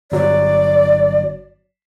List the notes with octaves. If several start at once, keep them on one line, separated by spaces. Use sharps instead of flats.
G1 F#3 D5